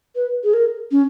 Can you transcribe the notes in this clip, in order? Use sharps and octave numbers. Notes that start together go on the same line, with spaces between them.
B4
G#4
A#4
C#4